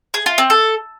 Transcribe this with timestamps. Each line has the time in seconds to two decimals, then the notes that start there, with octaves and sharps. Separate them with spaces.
0.14 G#4
0.26 F4
0.38 C4
0.50 A4